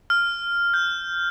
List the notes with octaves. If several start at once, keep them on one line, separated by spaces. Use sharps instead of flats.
F6
G6